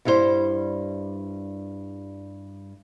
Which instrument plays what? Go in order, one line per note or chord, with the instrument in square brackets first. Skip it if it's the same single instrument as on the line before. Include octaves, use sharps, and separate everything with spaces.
[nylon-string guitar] G2 G3 E4 G#4 C5